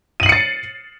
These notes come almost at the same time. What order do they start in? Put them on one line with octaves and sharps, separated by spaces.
D#7 F#7 C7 C#7 A6